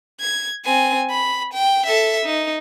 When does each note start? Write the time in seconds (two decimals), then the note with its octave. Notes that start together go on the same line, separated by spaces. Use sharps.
0.20 G#6
0.65 C4 G#5
1.10 B5
1.53 G5
1.86 A4 E5
2.26 D#4